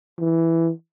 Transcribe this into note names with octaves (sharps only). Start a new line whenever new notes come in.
E3